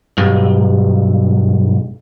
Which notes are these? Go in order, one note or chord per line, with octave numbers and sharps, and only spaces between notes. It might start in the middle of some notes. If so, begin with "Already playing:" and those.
B1 G2